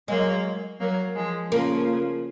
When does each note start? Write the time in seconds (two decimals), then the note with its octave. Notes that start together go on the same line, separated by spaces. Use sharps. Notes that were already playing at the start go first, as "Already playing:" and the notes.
0.08 F#3 G#3 A#3
0.79 F#3 A#3
1.15 F3 G#3
1.51 C#3 F3 A#3